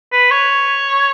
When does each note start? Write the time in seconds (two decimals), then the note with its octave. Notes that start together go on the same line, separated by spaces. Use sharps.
0.12 B4
0.31 C#5